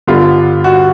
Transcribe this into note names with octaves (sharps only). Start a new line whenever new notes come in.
G2 D3 G3 B3 F4
F#4